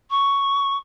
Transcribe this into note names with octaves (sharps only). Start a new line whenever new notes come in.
C#6